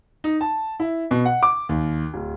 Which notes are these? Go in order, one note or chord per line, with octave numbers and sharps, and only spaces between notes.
D#4
A5
E4
B2
F#5
D6
D#2
D1